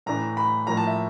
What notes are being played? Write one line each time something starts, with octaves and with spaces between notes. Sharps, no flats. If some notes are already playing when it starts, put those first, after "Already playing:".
A2 E3 A3 D4 A#5
B5
A2 F3 A#3 A#5
A5
E5